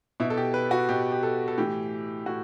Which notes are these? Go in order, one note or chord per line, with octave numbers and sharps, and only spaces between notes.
B2 E4
A4
G4
B4
F#4
B2 G4
G4
A4
A4
A2 E3 G4
A2 F#4